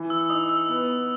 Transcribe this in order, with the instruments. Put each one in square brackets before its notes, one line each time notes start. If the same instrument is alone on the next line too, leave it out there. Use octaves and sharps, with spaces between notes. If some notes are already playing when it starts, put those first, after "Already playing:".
Already playing: [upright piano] E3
[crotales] E6
[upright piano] D#4 [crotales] D#6
[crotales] E6
[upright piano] B3